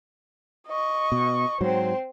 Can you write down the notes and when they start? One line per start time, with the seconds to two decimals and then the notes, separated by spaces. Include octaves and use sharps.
0.67 D#5 C#6
1.12 B2
1.61 G#2 F#3 C4 C5